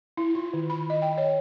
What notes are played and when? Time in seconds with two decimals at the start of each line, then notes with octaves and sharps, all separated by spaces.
0.17 E4
0.35 F4
0.54 D#3
0.70 B5
0.90 D#5
1.02 G5
1.18 C#5